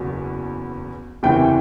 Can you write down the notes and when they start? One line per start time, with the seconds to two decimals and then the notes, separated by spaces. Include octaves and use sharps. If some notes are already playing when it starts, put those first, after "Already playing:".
Already playing: F#1 E2 B2 F#3 B3
1.23 F#1 E2 C3 E3 G5